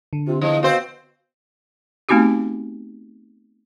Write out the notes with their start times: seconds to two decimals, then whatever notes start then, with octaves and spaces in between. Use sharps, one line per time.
0.13 D3
0.27 C3 F4
0.41 E2 F3 D#5
0.63 B2 C4 C5 F5
2.09 A3 B3 C4 D#4 F#4 G4